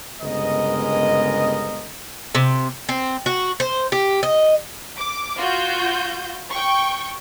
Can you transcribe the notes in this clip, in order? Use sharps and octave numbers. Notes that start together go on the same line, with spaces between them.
G1 C#3 G#3 B3 A#4 D#5
C3
C4
F#4
C5
G4
D#5
D6
F4 F#4 G6
G5 C#6